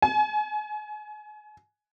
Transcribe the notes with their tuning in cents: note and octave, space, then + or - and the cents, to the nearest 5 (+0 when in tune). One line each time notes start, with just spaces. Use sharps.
G#5 +30